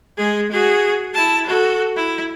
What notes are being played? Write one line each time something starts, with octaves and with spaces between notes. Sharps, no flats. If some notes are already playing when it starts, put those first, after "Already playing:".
G#3 G#4
F#4 G#4
E4 A5
F#4 A4
E4